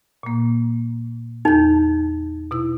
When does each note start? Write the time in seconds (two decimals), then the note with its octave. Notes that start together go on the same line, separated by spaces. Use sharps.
0.23 A#2 A#3
1.45 E2 D#4 G6
2.51 B2 E4 E6